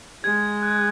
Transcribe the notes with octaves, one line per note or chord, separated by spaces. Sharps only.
G#3 G#6
F#6